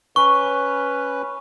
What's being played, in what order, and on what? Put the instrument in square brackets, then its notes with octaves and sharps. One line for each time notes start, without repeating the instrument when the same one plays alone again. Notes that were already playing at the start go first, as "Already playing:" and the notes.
[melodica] C#4 B4 [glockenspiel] C#6